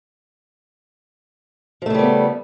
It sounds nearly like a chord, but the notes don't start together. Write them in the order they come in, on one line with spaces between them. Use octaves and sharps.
F3 A3 C#3 G3 B3